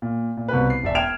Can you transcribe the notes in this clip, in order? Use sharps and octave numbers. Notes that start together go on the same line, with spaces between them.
A#2
A#2
C2 B2 B4
C7
E1 D5 E5
G5 F6 G#6 D7 E7 F7